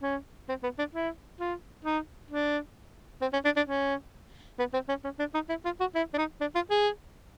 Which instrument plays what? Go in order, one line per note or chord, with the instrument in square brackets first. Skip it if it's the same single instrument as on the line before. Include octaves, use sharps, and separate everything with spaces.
[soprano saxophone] C#4
C4
B3
D4
E4
F4
D#4
D4
C4
C#4
D4
D4
C#4
B3
C4
C#4
C#4
D4
D#4
E4
F4
F#4
E4
D4
D#4
D4
F4
G#4